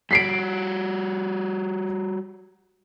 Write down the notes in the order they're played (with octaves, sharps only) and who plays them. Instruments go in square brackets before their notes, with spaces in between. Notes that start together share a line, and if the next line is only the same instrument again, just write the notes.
[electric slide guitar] G3 F#4 [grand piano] B6 C7 D7